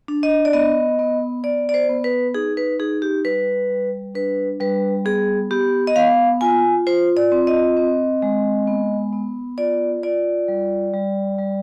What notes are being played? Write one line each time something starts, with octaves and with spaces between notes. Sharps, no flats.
D4
D#5
D5
B3 D#5
B3
B3 D5
D5
C5
B3
B4
D#4 G#4
B4
D#4 G#4
G4
G3 B4
G3
D4 B4
G3 B4
B3 G#4
B3 G4
D#5
B3 F5
F4 G#5
F4 C5
D5
C4
D#5
C4
G#3
B3
B3
F4 D5
F4 D5
G3
G3
G3